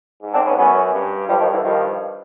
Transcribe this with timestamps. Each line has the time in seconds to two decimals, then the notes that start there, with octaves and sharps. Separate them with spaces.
0.22 G#2
0.34 C4 D4
0.46 B3 C#4
0.58 F#2 B3 C#4
0.93 G2
1.28 G2 F3 G3
1.40 D#3 F3
1.52 D3 E3
1.63 G2 D#3 F3